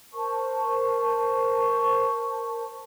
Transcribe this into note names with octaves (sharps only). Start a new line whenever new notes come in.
A#4 C5 A5 C#6